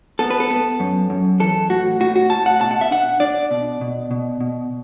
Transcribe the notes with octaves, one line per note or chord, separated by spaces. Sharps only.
B3 A4
B4
A4
B3
F#2
F#2
E3 A4
A2 F#4
A2 F#4
F#4
A2 A5
F#5
B2 A5
F#5
E5
D4 F#5
D4 D5
B2
B2
B2
B2